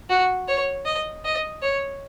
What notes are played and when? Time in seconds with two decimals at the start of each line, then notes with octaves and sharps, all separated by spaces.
0.10 F#4
0.48 C#5
0.86 D#5
1.25 D#5
1.62 C#5